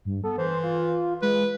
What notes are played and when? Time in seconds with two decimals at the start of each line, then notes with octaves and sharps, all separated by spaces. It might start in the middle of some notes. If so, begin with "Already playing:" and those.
0.05 G2
0.24 B3 A4
0.38 E3 C5
0.63 F4
1.22 G#3 B4